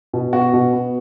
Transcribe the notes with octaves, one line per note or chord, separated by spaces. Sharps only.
B2
B3 F#4
B2
B3